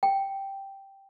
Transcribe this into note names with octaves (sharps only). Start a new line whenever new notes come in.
G5